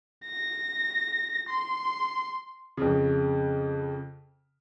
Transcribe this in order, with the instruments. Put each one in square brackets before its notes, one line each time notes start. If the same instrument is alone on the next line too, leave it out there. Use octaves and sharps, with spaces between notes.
[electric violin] A#6
C6
[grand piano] F2 C#3